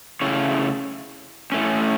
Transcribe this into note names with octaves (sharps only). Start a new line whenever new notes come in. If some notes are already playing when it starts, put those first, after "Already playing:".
C#3 A3 E4 C#5
A2 A3 C#4